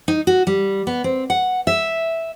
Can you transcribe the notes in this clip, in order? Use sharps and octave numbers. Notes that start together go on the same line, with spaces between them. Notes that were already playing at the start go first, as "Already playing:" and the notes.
D#4
F#4
G3
B3
C4
F#5
E5